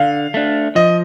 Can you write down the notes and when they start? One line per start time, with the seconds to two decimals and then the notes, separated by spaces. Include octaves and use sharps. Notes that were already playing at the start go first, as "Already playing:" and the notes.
Already playing: D3 F5
0.34 A3 D4
0.75 F3 D#5